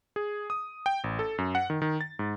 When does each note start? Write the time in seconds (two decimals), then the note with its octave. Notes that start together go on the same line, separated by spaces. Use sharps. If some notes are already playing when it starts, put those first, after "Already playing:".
0.16 G#4
0.50 D#6
0.86 G5
1.04 A1
1.19 A4
1.38 F#2
1.55 F#5
1.70 D#3
1.82 D#3
2.01 A6
2.19 G#2